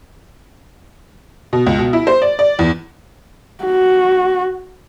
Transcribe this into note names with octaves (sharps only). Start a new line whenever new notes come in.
B2
C#2
B2
E4
C5
D5
D5
E2
F#4